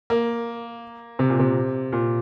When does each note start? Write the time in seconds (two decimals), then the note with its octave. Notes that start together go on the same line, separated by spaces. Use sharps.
0.10 A#3
1.19 C3
1.30 A#2
1.39 C3
1.92 A#2